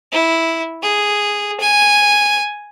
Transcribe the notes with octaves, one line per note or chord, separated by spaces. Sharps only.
E4
G#4
G#5